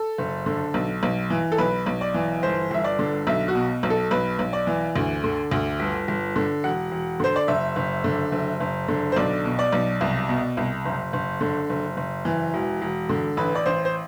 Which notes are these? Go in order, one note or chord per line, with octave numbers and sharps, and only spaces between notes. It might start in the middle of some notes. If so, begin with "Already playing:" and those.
Already playing: A4
F#1
D3
B1
B1
E3
A4
B1 B4
B1
D5
E3
G1 C5
G1 E5
D5
D3
B1 E5
F#4
B2
B1
A4
B1 B4
B1
D5
E3
D2
D3
D2
G1
G1
D3
E1 F#5
E1
D3 C5
D5
F#1 E5
F#1
D3
F#1
F#1
D3
C5
B1 D5
B2
D5
B1
C2
B2
C2
F#1
F#1
D3
F#1
F#1
E3
E1
E1
D3
A1 B4
D5
A1 C5
C5